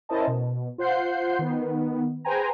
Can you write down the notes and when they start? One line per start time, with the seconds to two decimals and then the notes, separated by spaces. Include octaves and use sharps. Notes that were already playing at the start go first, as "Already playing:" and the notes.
0.09 C#4 E4 A#4 C5 D#5 A5
0.27 B2
0.78 F4 C5 F#5 G6 C7
1.39 D#3 B3
2.25 G#4 B4 C5 G5 G#5 A#5